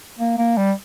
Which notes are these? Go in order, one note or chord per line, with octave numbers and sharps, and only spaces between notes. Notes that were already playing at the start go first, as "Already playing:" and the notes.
A#3
A#3
G3